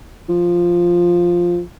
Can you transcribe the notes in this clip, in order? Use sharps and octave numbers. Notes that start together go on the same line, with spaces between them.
F3